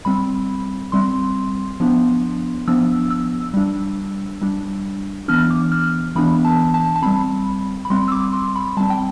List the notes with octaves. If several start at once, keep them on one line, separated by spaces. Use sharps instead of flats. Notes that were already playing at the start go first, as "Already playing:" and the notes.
G3 C4 B5
G3 C4 C6
F3 B3 D4
F3 B3 D4 E6
E6
G3 D4
G3 D4
E3 B3 D4 F6
D6
F6
E3 B3 D4 B5
A5
A5
A5
G3 C4 B5
B5
G3 C4 C6
E6
D6
C6
B5
G3 C4 A5
G5